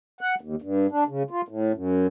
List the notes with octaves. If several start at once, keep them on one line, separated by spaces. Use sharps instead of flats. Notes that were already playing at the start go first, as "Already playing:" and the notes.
F#5
D#2
G2
D4
C#3
F4
A2
F#2